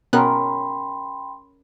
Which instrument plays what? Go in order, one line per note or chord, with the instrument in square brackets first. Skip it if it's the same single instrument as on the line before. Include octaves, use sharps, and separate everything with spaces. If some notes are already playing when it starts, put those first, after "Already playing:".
[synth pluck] B2 B3 F#6 [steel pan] C#4 A#4 [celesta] G5 B5 C6